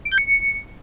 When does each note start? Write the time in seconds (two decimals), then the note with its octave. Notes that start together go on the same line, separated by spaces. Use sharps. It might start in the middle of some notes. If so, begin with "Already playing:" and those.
0.05 D7
0.12 G6
0.18 C#7